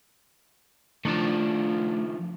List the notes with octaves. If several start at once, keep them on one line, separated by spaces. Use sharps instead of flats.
D#3 F3 A3 D4 A5